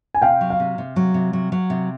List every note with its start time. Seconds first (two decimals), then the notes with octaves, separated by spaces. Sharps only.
0.14 G#5
0.22 C3 F5 G5
0.41 F#3
0.50 F5
0.60 C3
0.78 C3
0.96 F#3
1.14 C3
1.33 F#3
1.52 F#3
1.70 C3